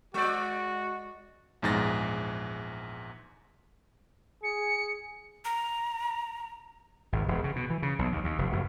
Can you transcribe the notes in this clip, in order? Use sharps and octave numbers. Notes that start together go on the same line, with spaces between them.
G#3 F#4 D5
A#1 E2 G#2 G#4 A6 A#6
G#4 C#7
A#5
G#1
E1
C#3
B2
E3
C#3
B1
D#2
D#2
F1
F#1